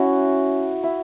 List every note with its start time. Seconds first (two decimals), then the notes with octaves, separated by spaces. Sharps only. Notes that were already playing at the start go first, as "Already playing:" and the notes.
Already playing: C#4 E4 F#4
0.83 E4